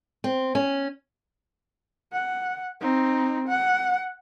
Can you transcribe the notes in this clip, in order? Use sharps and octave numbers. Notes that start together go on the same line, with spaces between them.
C4
C#4
F#5
C4 D#4
F#5